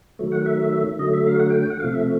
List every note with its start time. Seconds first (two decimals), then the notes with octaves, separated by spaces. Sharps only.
0.19 D#3 F#3 A3
0.32 F#5
0.46 E5
0.99 D3 F#3 A3 D#5
1.13 E5
1.27 F5
1.40 F#5
1.50 G5
1.60 G5
1.70 F#5
1.80 C3 F3 A3 F5
1.93 E5